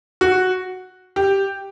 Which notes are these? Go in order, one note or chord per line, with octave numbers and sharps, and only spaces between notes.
F#4
G4